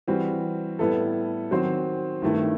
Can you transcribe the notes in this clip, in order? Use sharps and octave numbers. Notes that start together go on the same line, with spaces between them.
E3 G3 C4 F#4
A2 G3 B3 E4 A4
D#3 F#3 C4 F#4 C5
G2 D#3 A3 E4